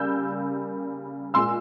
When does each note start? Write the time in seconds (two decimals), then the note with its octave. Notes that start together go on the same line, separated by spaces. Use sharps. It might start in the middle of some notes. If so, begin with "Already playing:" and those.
Already playing: C#3 G3 A#3 E6 G6
1.34 A#2 G#3 C6 E6